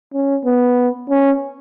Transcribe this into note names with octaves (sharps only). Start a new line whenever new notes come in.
C#4
B3
C#4